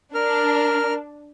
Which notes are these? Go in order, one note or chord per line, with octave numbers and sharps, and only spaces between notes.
D4 A#4 F6